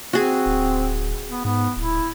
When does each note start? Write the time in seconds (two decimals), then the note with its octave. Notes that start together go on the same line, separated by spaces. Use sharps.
0.13 C4 F#4 G#4
0.46 D1
1.30 B3
1.45 G#2 B3
1.77 D1 E4